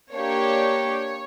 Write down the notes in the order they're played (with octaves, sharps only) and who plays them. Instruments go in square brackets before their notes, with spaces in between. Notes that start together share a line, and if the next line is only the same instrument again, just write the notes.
[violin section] A#3 D4 G4 C#5